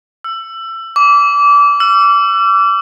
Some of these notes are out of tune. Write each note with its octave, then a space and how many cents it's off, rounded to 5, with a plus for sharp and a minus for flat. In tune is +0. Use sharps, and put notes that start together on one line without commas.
E6 +25
D6 -25
E6 +45